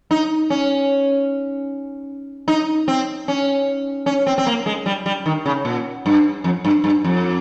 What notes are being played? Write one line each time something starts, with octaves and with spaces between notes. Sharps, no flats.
D#4
C#4
D#4
C4
C#4
C#4
C4
C4
A#3
G#3
G3
G3
D#3
C#3
A#2
G2
F2
G2
G2
F2